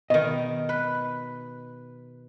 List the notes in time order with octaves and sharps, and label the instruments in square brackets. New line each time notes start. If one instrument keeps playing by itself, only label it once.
[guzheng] B2 D#3 [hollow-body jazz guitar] D#5
[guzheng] B4